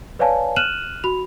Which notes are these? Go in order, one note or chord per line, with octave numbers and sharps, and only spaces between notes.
B4 C#5 D5 F5 G#5 A5
F6 F#6 D#7 E7 F#7
F#4 B5 F7